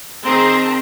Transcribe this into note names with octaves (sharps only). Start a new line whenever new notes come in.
D#3 C4 G#4 A#5 C6